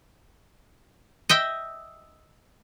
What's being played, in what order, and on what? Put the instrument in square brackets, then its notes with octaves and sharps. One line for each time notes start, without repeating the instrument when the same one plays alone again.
[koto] D#5 E5 G5